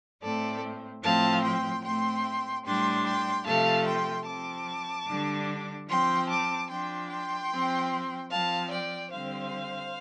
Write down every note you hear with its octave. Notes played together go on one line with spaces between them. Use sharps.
A2 A3 C4 A4 D5
A2 F3 C4 F5 A5
G5 C6
A2 A3 C4 G5 C6
A2 G3 D4 G5 C6
G5 C6
C3 F3 A3 F5 A5
G5 C6
F3 C4 A5 D6
D3 G3 D4
F3 C4 G5 C6
A5 D6
F3 D4 G5 C6
G5 C6
F3 C4
F3 C4 F5 A5
D5 G5
D3 G3 C4 C5 F5